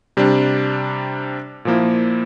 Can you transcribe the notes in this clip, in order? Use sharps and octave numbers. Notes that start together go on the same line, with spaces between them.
C3 G3 D4
A#2 F3 A#3 E4